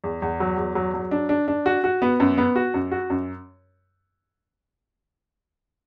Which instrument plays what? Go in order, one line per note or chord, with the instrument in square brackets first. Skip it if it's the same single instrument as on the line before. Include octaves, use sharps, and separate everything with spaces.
[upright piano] E2
E2
F#3
E2
F#3
F#3
D4
D4
D4
F#4
F#4
B3
F#2
B3
F#4
F#2
F#4
F#2